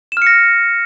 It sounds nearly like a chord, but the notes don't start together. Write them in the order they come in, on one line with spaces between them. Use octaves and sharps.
E7 F6 C#7 A#6